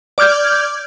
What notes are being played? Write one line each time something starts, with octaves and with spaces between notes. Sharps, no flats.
D5 D6 F6 G6 G#6